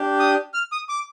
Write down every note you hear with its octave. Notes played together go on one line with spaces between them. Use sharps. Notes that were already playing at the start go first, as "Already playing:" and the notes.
Already playing: D4 G4
D#6
F6
D#6
D6